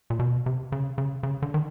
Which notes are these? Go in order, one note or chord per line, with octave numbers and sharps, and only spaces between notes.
A#2
B2
C3
C#3
C#3
C#3
D3
D#3